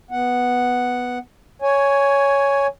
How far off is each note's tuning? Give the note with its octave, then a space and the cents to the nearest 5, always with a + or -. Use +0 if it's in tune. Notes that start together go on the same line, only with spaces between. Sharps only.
B3 +0 F#5 +0
C#5 +10 G#5 +0